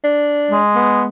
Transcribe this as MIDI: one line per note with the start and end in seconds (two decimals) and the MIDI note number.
0.04 0.59 62
0.51 1.06 56
0.76 1.06 59